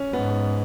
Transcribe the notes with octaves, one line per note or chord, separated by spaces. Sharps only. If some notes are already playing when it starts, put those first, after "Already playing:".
Already playing: C#4
G#2 B3